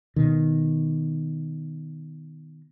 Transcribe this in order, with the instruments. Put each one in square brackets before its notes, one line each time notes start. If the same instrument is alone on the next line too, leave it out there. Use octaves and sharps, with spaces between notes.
[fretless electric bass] B2 D#3